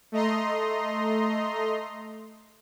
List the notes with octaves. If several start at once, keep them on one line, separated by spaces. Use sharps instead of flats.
A3 D#5 A#5 C6